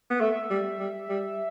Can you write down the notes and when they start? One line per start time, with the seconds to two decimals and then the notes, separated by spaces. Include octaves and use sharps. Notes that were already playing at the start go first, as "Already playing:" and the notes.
0.10 B3
0.21 A3 E5
0.50 G3
0.80 G3
1.09 G3